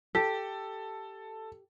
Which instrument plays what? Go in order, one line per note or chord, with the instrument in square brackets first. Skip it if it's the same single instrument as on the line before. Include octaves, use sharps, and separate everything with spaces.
[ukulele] G4 [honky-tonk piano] A4